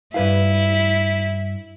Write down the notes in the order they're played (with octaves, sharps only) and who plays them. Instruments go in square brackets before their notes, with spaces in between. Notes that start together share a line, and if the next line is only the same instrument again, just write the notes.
[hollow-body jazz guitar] G2 B4 F5 [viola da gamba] E4